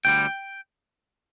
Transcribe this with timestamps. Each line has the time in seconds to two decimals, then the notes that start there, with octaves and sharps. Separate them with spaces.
0.05 D2 D3 G3 G5